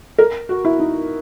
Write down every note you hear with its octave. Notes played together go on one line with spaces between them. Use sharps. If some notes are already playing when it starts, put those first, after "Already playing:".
A#4
F#4
E4
D#4